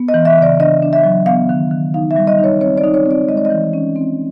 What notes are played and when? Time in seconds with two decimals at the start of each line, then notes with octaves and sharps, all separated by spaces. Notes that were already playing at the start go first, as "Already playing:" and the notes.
Already playing: B3
0.08 D#5
0.14 E3
0.25 E5
0.38 C#3 D5
0.60 D4 D#5
0.82 D4
0.93 E5
1.04 F#3
1.26 B3 F5
1.49 D#3
1.71 D#3
1.94 D#4 F5
2.11 E5
2.16 G3
2.27 D#5
2.39 D#4 C#5
2.61 C4 C#5
2.78 D5
2.84 D#4
2.94 C#5
3.06 C4
3.11 D5
3.29 G#3 D#5
3.37 D5
3.45 D#5
3.50 E3
3.74 C#4
3.96 C4